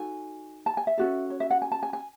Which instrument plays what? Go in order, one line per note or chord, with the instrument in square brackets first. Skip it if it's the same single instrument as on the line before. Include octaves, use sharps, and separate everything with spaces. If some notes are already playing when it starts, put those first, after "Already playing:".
Already playing: [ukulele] D#4 F#4 A4 G#5
A5
G#5
E5
C#4 F#4 A4
C#5
E5
F#5
G#5
A5
G#5
G#5